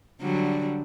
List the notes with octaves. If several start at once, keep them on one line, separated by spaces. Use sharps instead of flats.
D3 F#3 G3